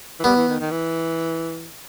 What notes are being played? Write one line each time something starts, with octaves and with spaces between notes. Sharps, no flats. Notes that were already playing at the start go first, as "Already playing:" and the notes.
E3
G3 B3
E3
D#3
D#3
E3